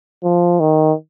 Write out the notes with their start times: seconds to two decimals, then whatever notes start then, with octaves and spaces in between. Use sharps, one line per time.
0.24 F3
0.60 D#3